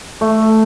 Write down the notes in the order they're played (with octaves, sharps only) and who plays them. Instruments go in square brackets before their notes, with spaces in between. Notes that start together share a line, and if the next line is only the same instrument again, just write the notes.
[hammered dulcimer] A3